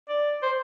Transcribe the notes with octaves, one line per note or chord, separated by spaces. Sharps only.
D5
C5